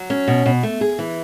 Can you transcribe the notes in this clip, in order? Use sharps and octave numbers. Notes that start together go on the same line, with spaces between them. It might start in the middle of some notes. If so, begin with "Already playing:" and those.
Already playing: F#3
C#4
B2
B2
A3
G#4
E3